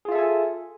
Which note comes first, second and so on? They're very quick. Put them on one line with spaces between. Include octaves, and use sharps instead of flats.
G#4 F4 E5 A4 G#5